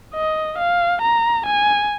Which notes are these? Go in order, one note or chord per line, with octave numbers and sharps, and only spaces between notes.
D#5
F5
A#5
G#5